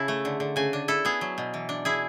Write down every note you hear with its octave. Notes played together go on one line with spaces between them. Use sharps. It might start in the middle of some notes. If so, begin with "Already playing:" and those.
Already playing: C#3 E4 A5
A3
D3
D3
C#3 G#5
D4
E4 A4
B3 G#4
F#3
B2
E3
D4
E4 G#4